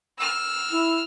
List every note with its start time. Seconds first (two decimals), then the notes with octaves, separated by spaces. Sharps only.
0.18 E6 F6
0.71 E4